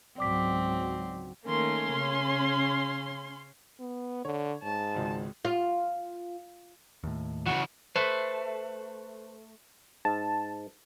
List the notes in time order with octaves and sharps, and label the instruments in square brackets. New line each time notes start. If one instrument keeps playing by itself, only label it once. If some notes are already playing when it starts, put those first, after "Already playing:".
[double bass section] C#2 G#2 F#3 [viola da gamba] C4 [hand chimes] D5 D6 B6
[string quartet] D#3 A3 A#3 [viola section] C#4 C6
[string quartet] C#3
[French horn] B3
[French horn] D3 [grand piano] C#5
[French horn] G#2 [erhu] A5
[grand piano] G#1 C#2
[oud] F4
[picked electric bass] D#2 A2
[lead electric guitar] C#3 E3 [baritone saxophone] F#4
[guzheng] A3 [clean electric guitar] B4 C5
[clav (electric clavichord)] G#2 [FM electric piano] A5